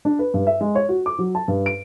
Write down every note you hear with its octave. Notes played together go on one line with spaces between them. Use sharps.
D4
B4
G2
E5
G#3
C#5
F#4
D6
F#3
A5
G2
D7